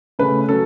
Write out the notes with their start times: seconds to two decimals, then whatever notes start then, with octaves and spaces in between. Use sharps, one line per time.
0.19 C#3 A3 C#4 B4
0.49 F#3 C#4 A4